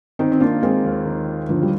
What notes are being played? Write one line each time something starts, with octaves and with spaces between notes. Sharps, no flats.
D#3 C4 D#4
C4
A#3 D4 F4
G#3 A#3 C4
D#2
D#3
F4
D3 F3 A#3
G3